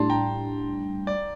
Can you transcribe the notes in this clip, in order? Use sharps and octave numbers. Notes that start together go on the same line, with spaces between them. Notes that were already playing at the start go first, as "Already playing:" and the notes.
Already playing: A2 G3 D4 A5 C6
G5 A#5
D5